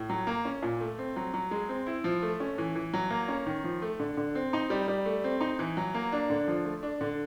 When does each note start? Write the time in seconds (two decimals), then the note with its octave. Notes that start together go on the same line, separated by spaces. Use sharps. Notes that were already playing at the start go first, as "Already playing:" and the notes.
Already playing: A2
0.10 F#3
0.27 A#3
0.45 C#4
0.62 A#2
0.81 A3
0.98 C4
1.16 F#3
1.34 F#3
1.51 G#3
1.69 C4
1.87 E4
2.04 F3
2.22 A3
2.40 C#4
2.58 E3
2.75 E3
2.94 F#3
3.10 A#3
3.28 C#4
3.46 D#3
3.64 F3
3.82 A3
4.00 D3
4.17 D3
4.35 C4
4.53 D#4
4.70 G3
4.88 G3
5.05 A3
5.24 C4
5.41 D#4
5.59 E3
5.77 F#3
5.94 A#3
6.12 D4
6.30 D3
6.48 F3
6.65 A3
6.83 D4
7.01 D3